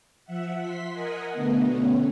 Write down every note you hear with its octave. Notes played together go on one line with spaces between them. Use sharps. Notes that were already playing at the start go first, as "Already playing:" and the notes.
F3 E5 F#5
C6 B6
A#4 D#5 F#5 G#5
B2 D3 A3 B3
A3 C#4